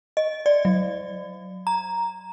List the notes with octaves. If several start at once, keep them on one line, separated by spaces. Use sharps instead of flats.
D#5
D5
F#3
A#5